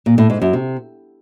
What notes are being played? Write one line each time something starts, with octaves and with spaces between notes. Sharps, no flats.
A#2
A2
G#2
F#2
C3